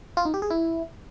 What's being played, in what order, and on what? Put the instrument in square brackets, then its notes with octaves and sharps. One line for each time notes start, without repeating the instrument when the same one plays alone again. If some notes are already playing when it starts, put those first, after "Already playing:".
[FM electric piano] F4
D#4
G4
G#4
E4